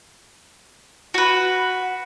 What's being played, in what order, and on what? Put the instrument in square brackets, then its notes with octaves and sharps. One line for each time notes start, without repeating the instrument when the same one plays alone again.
[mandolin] F#4 B4